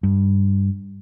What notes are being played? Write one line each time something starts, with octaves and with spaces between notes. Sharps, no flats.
G2